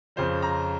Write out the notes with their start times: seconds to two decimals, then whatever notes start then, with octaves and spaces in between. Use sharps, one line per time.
0.16 F2 C#3 F3 C5
0.42 A#5